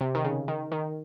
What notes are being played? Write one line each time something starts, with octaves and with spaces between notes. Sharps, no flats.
C3
D#3
C#3
D#3
D#3